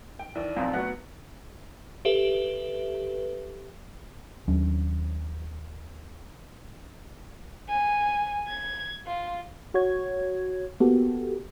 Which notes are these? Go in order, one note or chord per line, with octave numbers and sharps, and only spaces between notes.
G5
D#2 E3 E4 D5
B1 F2 A#2 F4
A2 F#3 B3 F#5
G4 A4 B4 E5
D#2 F#3 C#4 D4
G#5
G#6
F4
F#4 C#5 G#6
A#3 B3 F#4 G4 A4